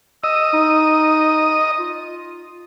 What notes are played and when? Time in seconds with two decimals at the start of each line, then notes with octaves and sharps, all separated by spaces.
0.24 D#5 E6
0.53 D#4
1.79 F4